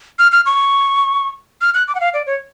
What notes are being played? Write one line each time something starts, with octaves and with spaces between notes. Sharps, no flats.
F6
F6
C#6
F6
F#6
D6
F#5
F5
D5
C#5